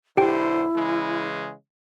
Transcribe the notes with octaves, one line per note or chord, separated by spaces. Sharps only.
B1 D3 E4 G4 C5 G5
C#3 E3 G#3